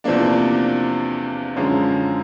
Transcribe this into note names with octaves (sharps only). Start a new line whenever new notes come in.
E2 C3 F3 A#3 D4
F#2 D3 F3 G#3 C#4